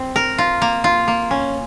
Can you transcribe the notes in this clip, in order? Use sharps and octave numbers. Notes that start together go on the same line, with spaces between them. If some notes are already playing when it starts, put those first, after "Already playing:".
Already playing: C4
A#4
F4
A#3
F4
A#3
C#4